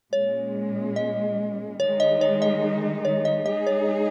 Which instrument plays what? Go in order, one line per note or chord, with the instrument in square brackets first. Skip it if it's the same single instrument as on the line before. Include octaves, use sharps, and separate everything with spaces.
[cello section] A#2 G#3 C#4 [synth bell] C#5
[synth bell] D#5
[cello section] D#3 G#3 D#4 [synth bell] C#5
[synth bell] D#5
C#5
D#5
C#5
D#5
[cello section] G#3 D#4 G#4 [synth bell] D#5
[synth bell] C#5